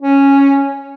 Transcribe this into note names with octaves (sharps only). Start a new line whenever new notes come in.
C#4